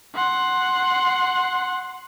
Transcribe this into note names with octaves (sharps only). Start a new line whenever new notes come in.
F#5 C6